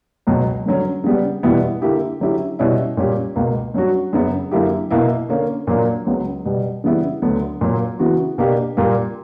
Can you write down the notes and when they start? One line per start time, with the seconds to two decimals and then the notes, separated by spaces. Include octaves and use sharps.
0.27 C#2 B2 F#3
0.66 G2 D3 F#3 C#4
1.04 C#3 G3 B3
1.43 E2 B2 G3 B3 E4
1.82 D3 A#3 E4 G4
2.20 D3 F#3 C#4 E4 G4
2.59 B2 G3 C#4 E4
2.97 A#2 G3 C#4 G4
3.36 C#2 B2 A#3
3.74 G2 F#3 C#4 F#4
4.13 F#2 C#3 F#3 B3
4.51 F#2 D3 A#3 E4 G4
4.90 B2 A#3 E4
5.29 D3 A#3 C#4
5.67 A#2 F#3 A#3 D4
6.07 C#2 C#3 F#3 B3
6.45 B2 G3 B3
6.84 C#3 E3 G3 B3 E4
7.22 D2 D3 F#3 B3
7.61 A#2 F#3 A#3
7.99 C#3 E3 B3 F#4
8.38 B2 A#3 D4 G4
8.77 A#2 G3 A#3